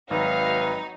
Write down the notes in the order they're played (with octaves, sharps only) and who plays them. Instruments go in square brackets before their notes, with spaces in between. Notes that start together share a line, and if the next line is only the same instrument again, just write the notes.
[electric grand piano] G#1 [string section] F#3 D#4 [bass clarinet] B4 [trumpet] F5